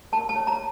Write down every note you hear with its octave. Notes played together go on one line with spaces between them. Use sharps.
A#4 A5
A5
C#5
A#5